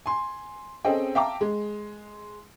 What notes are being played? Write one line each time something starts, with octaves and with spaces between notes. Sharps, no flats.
G#5 C6
C4 C#4 G#4 A4 D#5 G5
E5 F5 G5 A5 A#5 D6
G#3